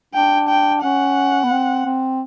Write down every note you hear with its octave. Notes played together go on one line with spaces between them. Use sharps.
D4 G5
G5
C#4 F#5
B3
C4
C4